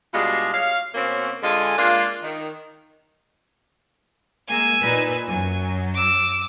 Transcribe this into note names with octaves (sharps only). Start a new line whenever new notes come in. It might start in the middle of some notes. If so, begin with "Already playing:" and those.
B2 G3 G#3 D4 F4
C#5 F5
B2 A#3 C4 C#4
D3 G#3 F4 A4 G#5
G#3 A#3 D4 F4
D#3
G#3 A#3 G#5 E6
A#2 D#4 B4
F#2 F#3 G#5
D6 E6